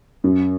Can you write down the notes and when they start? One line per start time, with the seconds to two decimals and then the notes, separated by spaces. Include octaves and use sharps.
0.24 F#2